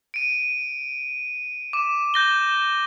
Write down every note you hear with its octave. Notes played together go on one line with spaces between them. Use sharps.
D7 D#7
D6 E7
G6 A#6 G7